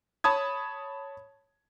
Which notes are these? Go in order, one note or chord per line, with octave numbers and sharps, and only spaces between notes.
C#5 A5 B5 D#6 G#6